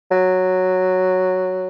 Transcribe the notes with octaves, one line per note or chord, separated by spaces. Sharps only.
F#3